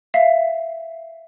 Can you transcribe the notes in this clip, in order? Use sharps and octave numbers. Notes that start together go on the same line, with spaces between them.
E5 F5